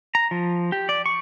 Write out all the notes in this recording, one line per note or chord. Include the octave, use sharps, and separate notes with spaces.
A#5
F3
G4
D5
C#6